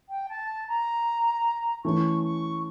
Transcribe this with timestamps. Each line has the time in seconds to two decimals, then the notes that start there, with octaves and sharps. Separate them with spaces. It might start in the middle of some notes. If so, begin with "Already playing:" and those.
0.09 G5
0.28 A5
0.68 A#5
1.84 E3 A3 C#4 E4 C#6
2.23 C#6